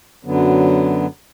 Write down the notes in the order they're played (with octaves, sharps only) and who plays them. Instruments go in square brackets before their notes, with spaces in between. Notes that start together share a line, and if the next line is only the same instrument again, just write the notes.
[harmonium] F#2 D3 F#3 B3